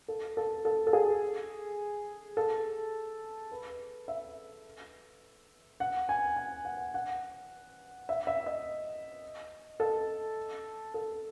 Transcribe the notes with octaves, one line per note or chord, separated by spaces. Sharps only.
A4
A4
A4
A4
G#4
A4
B4
E5
F#5
G#5
G#5
F#5
F#5
E5
E5
D#5
A4
A4